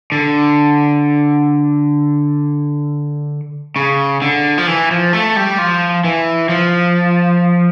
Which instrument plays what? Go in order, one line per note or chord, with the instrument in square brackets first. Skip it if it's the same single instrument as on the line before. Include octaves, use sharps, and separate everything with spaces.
[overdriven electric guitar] D3
C#3
D3
F3
E3
F3
A3
G3
F3
E3
F3